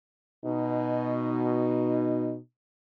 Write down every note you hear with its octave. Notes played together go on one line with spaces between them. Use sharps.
B2 D#4